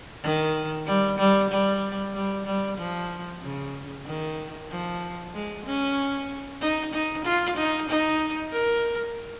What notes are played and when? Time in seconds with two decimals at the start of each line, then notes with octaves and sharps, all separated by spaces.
0.23 D#3
0.86 G3
1.19 G3
1.50 G3
2.14 G3
2.46 G3
2.78 F3
3.42 C#3
4.06 D#3
4.70 F3
5.34 G#3
5.65 C#4
6.61 D#4
6.93 D#4
7.25 F4
7.57 D#4
7.89 D#4
8.52 A#4